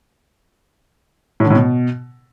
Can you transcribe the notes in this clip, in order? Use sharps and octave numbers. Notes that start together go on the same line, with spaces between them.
A2
D3
A2
B2